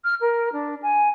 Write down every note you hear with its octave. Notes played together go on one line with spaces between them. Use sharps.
F6
A#4
D4
G#5